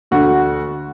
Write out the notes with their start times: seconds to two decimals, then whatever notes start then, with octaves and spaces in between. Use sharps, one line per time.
0.11 D2 D3 F#4